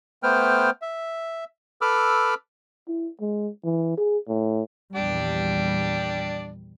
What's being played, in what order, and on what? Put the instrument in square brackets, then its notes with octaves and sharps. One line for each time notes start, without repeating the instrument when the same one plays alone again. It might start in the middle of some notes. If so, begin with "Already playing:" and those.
[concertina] A3 B3 B4 C5 G5 F6
E5
A4 B4 B5 D6 E6 F6
[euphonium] E4
G#3
E3
G#4
A2
[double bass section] A#1 E2 G3 [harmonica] D4 G4 D5